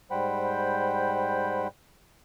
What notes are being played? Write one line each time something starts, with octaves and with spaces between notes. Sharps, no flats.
G#2 G3 C5 F#5 G5 B5